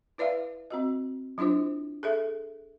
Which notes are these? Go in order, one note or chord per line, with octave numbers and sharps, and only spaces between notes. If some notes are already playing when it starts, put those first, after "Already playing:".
E4 B4 D5 E5 F5
C4 F#4 D#5
F#3 D4 E4 F4 C5
G#4 A4 E5